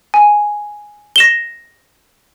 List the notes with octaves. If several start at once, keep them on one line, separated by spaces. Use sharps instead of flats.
G#5
A#6 E7 G7